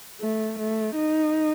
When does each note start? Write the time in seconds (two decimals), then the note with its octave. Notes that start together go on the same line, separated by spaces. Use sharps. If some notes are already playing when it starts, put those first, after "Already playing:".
0.21 A3
0.58 A3
0.95 D#4